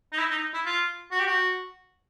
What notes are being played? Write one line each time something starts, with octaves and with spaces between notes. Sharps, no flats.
D#4
E4
D#4
E4
F4
F#4
G4
F#4